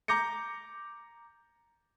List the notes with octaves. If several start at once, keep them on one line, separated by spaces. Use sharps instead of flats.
A#5 D6 G6 A#6 C#7